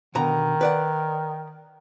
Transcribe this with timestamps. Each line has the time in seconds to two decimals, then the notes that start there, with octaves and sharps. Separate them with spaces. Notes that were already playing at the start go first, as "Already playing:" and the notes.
0.15 B2 D3 D#3 A#5
0.61 B4 D5 F#5